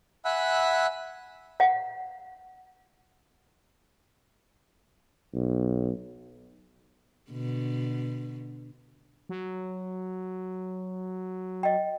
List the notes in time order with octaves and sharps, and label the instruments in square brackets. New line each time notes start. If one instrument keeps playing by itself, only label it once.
[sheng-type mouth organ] E5 F#5 G#5 B5 E6 F#6
[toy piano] F5 F#5
[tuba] B1
[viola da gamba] B2 D3
[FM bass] F#3
[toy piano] D#5 G5